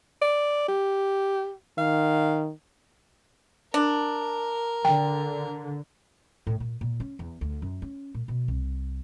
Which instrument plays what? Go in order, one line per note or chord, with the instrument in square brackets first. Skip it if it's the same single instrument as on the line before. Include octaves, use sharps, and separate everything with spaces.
[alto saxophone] D5
G4
[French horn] D#3 [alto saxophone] F5
[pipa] D4 [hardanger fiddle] A#4
[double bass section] D3 [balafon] G5
[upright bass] A2
A#2
A#2
C#4
E2
D2
F#2
C#4
A#2
B2
C2